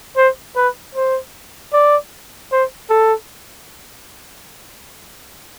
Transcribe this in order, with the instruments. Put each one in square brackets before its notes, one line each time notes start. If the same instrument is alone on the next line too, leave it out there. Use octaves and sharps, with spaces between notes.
[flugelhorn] C5
B4
C5
D5
C5
A4